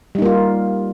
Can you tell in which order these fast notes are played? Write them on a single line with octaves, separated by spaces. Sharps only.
G3 D#4 A#3 F4